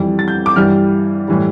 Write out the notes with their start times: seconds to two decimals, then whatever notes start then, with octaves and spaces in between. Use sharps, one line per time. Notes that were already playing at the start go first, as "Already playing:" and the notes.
Already playing: F2 E3 G3
0.19 A6
0.28 G6
0.46 D6
0.56 G2 E3 G3 F6
1.28 A2 E3 G3